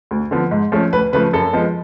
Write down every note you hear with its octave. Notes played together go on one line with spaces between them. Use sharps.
D2
D3 F3 B3
G#2
F3 A3 C#4
D2 B4
C#3 F3 A3 B4
F#2 A4
F3 G#3 B3